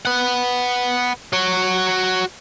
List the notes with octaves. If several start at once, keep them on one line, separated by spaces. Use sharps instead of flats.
B4 F#5
F#4 C#5